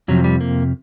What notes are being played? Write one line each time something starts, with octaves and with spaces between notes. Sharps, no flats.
F2 C3 F3 F#3
G3
A#3